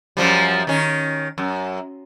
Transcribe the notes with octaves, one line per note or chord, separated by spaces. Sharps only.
F#2 F3 G3
D#3 C#4
F#2